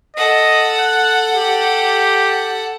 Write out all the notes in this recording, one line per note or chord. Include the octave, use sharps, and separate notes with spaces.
A4 D#5 F#5
F#6
G4